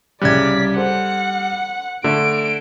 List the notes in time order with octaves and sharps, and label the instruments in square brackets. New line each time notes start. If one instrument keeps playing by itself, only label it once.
[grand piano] C2 C#3 F#6 [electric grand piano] G3 G#6 [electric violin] D5 B6
[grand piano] A4 C5 [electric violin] F#5
[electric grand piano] D3 [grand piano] A3 [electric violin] D7